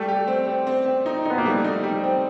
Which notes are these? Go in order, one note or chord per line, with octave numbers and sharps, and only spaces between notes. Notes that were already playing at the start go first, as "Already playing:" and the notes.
Already playing: G3 A3
G4
C4
C4
C4
C4
D#4
B3 D#4
A#3
G3 A3
D#4
G3
C4